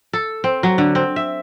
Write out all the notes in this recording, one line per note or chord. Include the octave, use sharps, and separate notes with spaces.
A4
C4
F#3
D3
C4
E5